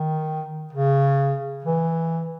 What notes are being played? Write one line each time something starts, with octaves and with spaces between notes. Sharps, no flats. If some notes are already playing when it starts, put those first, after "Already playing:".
Already playing: D#3
C#3
E3